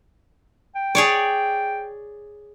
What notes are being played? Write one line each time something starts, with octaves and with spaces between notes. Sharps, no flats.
G5
G#4 C#5 D5